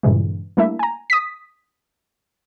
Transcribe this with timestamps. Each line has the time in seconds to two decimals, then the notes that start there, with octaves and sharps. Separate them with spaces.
0.03 G2 A#2 C#3 E3 G#3
0.57 G3 A3 A#3 D4 E4 E5
0.79 G#5 A#5
1.10 D#6 B6